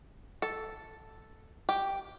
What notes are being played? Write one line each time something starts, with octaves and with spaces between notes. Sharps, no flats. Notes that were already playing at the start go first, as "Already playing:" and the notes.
A4
G4